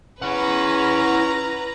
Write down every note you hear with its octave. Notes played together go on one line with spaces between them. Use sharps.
C#4 E4 B4 F#5 A#5